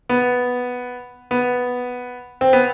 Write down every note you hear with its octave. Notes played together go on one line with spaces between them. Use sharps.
B3
B3
C4
B3